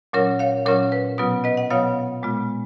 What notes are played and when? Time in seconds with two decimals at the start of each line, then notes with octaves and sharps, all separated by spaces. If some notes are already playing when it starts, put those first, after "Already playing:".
0.13 A#2 F#3 C#4 F4 A#4 C#5
0.39 C#5 F5
0.66 A#2 F#3 C#4 F4 A#4 C#5
0.92 B4
1.18 B2 F#3 B3 F4 B4
1.44 B4 D#5
1.57 D#5 F#5
1.70 B2 F#3 B3 F4 C#5 F5
2.23 A#2 G#3 B3 F4